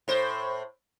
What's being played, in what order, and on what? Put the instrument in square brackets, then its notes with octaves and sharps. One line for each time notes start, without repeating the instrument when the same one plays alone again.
[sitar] A2 C5